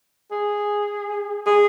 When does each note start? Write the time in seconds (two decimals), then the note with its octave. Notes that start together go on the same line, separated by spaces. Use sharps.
0.31 G#4
1.46 G#4